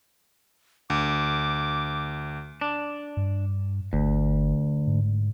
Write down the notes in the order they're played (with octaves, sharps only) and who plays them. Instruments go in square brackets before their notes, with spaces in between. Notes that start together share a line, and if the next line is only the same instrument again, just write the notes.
[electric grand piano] D2 [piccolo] D6
[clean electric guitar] D4
[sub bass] G2
[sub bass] G1 [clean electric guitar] D2
[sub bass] G#2